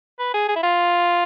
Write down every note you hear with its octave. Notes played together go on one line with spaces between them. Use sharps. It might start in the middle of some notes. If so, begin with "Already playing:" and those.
B4
G#4
G#4
E4
F4